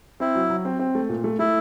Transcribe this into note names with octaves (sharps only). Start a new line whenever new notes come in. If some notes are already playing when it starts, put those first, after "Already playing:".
C4 E4
F#3
F#3
C4
C4
A3
A#2
A3
A3 E4